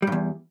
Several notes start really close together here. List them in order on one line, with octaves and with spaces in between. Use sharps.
G3 G2 E2